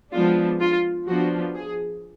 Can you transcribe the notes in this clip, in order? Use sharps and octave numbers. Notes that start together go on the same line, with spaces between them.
F3 G#3 B3 D4 F4
F4
F3 B3 D4 F#4
G#4